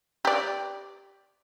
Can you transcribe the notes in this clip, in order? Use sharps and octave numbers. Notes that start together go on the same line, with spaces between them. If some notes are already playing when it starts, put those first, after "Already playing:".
G4 D5